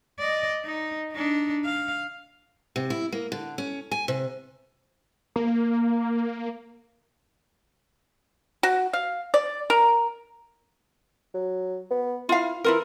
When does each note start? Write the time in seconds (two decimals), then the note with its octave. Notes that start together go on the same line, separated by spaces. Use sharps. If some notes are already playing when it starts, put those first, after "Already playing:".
0.19 D5 D#5
0.65 D#4
1.13 D4 D#4
1.65 F5
2.76 C3
2.90 E4
3.12 A#3
3.32 D3
3.58 C#4
3.91 G#5
4.08 C3
5.36 A#3
8.63 F#4
8.93 F5
9.34 D5
9.70 A#4
11.34 F#3
11.90 B3
12.29 E4 F4 F5
12.64 E3 E4 F4 A#4